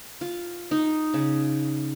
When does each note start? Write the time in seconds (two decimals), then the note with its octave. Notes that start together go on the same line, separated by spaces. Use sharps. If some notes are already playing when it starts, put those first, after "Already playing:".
0.21 F4
0.71 D#4
1.14 C#3